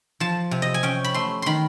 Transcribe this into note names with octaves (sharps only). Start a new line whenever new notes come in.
F3 A5
C3
D#5
G#5
C#4 G5
B5
A3 C6
D#3 B5 C6